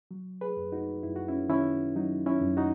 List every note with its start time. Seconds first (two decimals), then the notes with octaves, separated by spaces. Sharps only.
0.11 F#3
0.41 G#4 B4
0.57 F#2
0.72 D#4 F#4
1.03 F#2 E4
1.16 F#4
1.28 C#4 E4
1.49 D#3 C#4 E4
1.96 F#3 D#4
2.26 C#4 E4
2.41 F#2
2.57 D#4 F#4